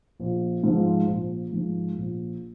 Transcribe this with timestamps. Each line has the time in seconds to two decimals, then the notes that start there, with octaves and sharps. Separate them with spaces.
0.20 A#1
0.64 G#2 F3
1.07 A#1
1.52 G#2 F3
1.96 A#1